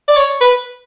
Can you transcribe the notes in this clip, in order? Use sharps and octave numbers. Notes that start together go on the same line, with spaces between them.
D5
C#5
B4